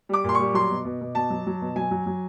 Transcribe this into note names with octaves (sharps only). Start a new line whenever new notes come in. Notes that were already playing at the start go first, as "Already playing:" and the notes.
G3 D6
A#2 C6
G3 C#6
F#3 C6
B2
B2
B2
B2 A5
F#3
F#3
B2
F#3 G#5
F#3
F#3